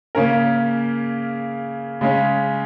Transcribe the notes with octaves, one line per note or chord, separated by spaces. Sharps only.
C#3 A#3 C#4 A#4
C#3 G#3 C#4